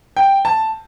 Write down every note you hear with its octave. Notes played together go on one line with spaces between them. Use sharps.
G5
A5